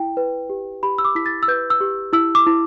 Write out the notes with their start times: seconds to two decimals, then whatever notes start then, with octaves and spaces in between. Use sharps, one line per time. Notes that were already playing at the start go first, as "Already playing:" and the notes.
Already playing: E4 G5
0.17 B4
0.49 G4
0.83 G4 B5
0.98 E6
1.05 D6
1.15 E4 B6
1.26 A6
1.43 E6
1.48 B4 G6
1.70 E6
1.80 G4
2.13 E4 E6
2.35 D6
2.46 E4